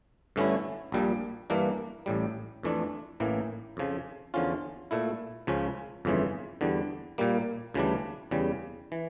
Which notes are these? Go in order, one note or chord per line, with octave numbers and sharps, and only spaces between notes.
G2 D3 A3 C#4 E4
A#1 A#2 G3
G2 E3 A#3 D4
A1 A2 G3
F2 E3 A3 D4
A1 A2 E3 A#3
F2 C#3 F3
E2 D3 F3 C#4 F4
A#2 A3 E4
C#2 C#3 F3 C#4
G1 F2 C#3 E3
E2 D3 G3
A#2 G3 A#3
D2 C#3 E3 G3 D4
E2 C#3 G3
E3